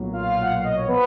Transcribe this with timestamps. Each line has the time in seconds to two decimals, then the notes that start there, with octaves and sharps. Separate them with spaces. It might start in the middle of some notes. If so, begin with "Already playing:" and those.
Already playing: B1 A#2 F#3
0.13 F4 F5
0.41 F#5
0.53 F5
0.64 D#5
0.76 C#5
0.87 F3 B3 B4